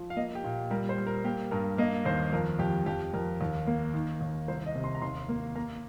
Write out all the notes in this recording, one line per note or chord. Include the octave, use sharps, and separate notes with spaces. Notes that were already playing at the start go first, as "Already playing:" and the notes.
Already playing: F3
F5
A#3 D#5
G4
A#2
G3 A#4
C5
G3
A#4
A#3 G4
G2 A#4
A#3 D#5
D#2 C5
F2 A#4
F2 G4
F2 G4
F2 A#4
D#2
A#3
D#3
D#2
C2 C5
D#5
C3
C6
A#5
D#2 C6
A#3
A#3 A#5